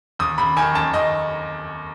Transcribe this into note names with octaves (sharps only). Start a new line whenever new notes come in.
D#2 D#6
D#2 B5
D#3 G#5
D#2 A5
D#2 D#5